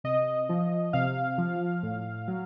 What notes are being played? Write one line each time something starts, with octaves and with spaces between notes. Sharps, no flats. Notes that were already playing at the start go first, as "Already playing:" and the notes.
C3 D#5
F3
C3 F5
F3
A2
F#3